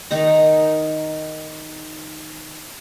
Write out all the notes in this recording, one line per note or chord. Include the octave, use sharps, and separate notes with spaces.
D#3 D#4 A#5